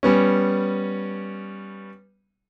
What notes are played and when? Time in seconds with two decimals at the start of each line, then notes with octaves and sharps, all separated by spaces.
0.03 G3 B3 C#4